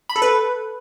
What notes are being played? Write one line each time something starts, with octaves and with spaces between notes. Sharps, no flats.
B5
A4
B4